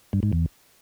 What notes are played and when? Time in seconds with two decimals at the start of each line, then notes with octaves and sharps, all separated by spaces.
0.13 G2
0.23 G#2
0.33 E2